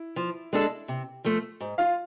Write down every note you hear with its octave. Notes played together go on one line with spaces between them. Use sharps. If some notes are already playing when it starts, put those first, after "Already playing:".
Already playing: E4
F3
G#3 D4 A4
C3
F3 A3
G#2
F4 F5